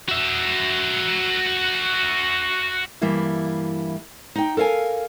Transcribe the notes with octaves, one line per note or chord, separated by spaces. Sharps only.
F#4 E5
G2 E3 G3 A#3 E4
D#4 G5
A4 A#4 F5 G#5